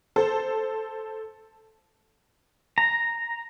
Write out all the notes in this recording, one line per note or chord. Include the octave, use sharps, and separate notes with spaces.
A4 C5
A#5